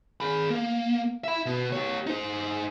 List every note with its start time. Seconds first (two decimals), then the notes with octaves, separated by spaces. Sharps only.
0.21 G#4 B5
0.50 A#3
1.24 E5 B5
1.46 B2
1.72 G4 C#5
2.07 D#4 C5